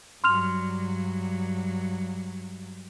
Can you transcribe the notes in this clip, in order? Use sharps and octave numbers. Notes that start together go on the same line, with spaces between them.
G2 F#3 C6 F6 F7